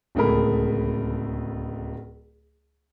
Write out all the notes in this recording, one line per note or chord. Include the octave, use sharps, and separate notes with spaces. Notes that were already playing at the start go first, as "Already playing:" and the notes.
D1 C#2 A3 G#4 A#4 B5